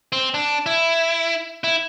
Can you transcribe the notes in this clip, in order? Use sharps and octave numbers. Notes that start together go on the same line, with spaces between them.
C4
D4
E4
E4